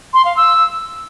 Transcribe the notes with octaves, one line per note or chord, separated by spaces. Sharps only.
C6
F5
E6